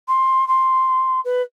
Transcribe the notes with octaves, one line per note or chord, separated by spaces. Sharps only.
C6
C6
B4